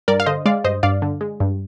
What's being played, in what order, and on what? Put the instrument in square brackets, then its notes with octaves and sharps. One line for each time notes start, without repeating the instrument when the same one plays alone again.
[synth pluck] G2 A#4 D5
F5
D3 C5 D#5
G#3 D5 F5
G2 C5 D#5
G2 D5 F5
D3
G#3
G2